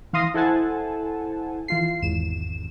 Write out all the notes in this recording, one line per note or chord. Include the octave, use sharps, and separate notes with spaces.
E3 F5 C6 D#6 A#6
E4 A4 C5 F#5 G#5 A5
E3 F4 C7
G#1 E2 E7